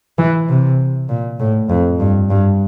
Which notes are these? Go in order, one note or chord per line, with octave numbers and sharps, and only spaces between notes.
E3
C3
A#2
A2
F2
G2
G2